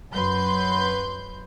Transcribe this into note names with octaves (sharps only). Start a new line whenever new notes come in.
F#2 F#3 B4 C6 G6